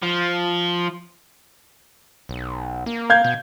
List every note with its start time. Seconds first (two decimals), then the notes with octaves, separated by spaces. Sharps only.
0.02 F3
2.29 B1
2.86 A#3
3.10 F5 G6 G#6
3.24 B2